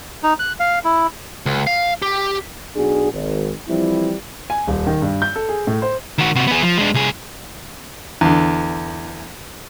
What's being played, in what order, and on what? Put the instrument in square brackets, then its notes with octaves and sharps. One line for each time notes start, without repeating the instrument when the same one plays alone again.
[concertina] D#4
F#6
F5
E4
[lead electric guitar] C#2
F5
G4
[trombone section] B1 D4 F#4 G#4
G#1
E3 F3 G3 C4 E4
[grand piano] G#5
D#1
D#3
G2
G6
A4
G#4
A2
C5
[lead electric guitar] D#3 F#4
C3 F#4
B3 G#4
F3
G#3 D4
C2 G#4
[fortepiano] E2 D3